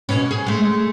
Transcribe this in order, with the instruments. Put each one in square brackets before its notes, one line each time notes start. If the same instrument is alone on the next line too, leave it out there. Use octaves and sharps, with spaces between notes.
[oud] B2 C#4
G#4
G#3 A3